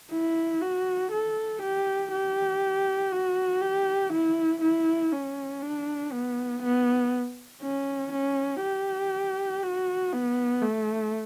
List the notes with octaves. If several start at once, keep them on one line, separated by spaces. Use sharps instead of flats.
E4
F#4
A4
G4
G4
F#4
G4
E4
E4
C#4
D4
B3
B3
C#4
C#4
G4
F#4
B3
A3